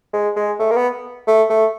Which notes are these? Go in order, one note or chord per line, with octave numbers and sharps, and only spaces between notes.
G#3
G#3
A3
A#3
B3
A3
A3